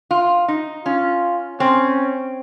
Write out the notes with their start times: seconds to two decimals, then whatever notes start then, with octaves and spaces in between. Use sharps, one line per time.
0.11 F4
0.48 D#4
0.85 C#4 F4
1.60 C4 C#4